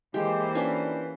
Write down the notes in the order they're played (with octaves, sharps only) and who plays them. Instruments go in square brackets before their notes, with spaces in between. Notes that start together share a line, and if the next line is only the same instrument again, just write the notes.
[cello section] E3 A#3 C5 [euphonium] G#3 [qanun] G4
[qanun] C#4 F4 [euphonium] D4 [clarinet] B4